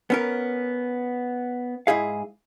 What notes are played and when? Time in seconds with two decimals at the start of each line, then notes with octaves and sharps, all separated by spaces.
0.10 B3 C#4 A#4
1.87 G#2 E4 G#4 F5